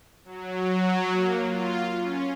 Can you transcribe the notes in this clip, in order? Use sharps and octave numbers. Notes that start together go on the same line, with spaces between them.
F#3
A#3
F4
C#4